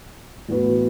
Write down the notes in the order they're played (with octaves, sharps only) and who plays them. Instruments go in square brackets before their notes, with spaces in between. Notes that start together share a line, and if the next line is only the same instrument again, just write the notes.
[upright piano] A2 E3 B3 F#4 B4